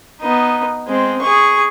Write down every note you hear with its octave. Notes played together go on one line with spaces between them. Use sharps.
B3 D#4
G#3 C4
G#4 C#6